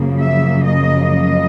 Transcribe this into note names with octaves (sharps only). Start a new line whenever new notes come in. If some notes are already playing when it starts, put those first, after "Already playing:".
Already playing: F#2 C#3 F3 A#3
E5
D#5
D#5